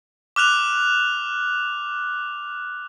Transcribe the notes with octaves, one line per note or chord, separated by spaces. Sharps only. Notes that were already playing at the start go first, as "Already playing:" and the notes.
D6 F6 F#6 F7